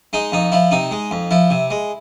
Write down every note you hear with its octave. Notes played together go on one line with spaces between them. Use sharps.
G#3 D#4
F2 D#4
F3 E4
C3 D#4
G#3
F2
F3 E4
C3
G#3